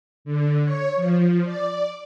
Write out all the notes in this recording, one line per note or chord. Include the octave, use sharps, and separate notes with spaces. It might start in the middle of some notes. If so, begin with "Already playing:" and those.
D3
C#5
F3
D5